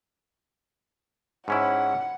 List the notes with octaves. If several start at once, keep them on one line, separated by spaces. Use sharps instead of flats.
G#2 C#4 E4 F#5